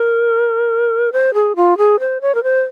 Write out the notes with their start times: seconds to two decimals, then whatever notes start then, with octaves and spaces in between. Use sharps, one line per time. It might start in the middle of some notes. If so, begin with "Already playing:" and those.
Already playing: A#4
1.13 C5
1.34 G#4
1.56 F4
1.78 G#4
2.00 C5
2.21 C#5
2.35 A#4
2.43 C5